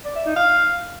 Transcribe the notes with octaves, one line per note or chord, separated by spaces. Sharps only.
D5
E5
D#4
F5